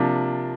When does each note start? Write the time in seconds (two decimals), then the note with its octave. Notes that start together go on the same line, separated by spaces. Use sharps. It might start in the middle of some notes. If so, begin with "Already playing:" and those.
Already playing: C3 F3 A#3 D4